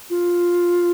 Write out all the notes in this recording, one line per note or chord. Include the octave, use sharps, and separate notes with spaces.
F4